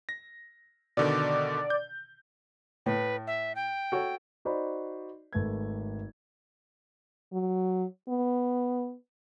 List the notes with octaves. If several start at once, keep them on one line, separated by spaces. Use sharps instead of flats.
A#6
B2 D3 D#3 D5
G6
A2 B4
E5
G5
F#4 A4 C#5
D#4 F#4 C5 D5 D#5 B5
G#1 A3 B4 G#6
F#3
B3